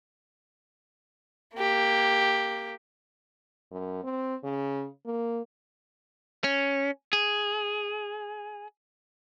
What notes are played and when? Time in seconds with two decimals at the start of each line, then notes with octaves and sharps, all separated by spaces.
1.56 A#3 G4
3.71 F#2
4.04 C4
4.44 C#3
5.06 A#3
6.44 C#4
7.13 G#4